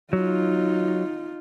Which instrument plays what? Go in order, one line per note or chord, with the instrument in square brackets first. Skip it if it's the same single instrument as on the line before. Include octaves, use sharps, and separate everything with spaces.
[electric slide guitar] F#3 [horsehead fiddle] D#4 F4